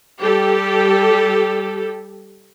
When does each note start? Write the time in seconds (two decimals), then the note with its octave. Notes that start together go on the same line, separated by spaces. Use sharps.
0.22 G3 G4 A4